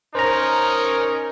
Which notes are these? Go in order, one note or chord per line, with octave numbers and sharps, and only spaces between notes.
C#4 D#4 A#4 C5 A#5